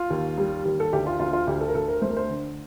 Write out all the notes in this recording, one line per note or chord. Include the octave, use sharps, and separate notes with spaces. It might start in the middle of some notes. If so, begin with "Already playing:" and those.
Already playing: F4
D#2
G3
D#2
A4
D2 G4
F4
D2 F4
F4
D2 G4
A4
A#4
D2 A4
A#4
A3 C5
A#4
C5
D3